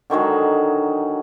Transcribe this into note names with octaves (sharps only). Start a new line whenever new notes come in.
D3 D#3 F#3 G#3